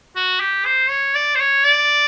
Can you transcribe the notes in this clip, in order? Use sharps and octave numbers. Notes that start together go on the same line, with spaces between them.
F#4
G4
C5
C#5
D5
C5
C#5
D5